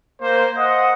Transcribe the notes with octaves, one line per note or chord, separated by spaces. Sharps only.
A#3 C5
C5 D#5 F#5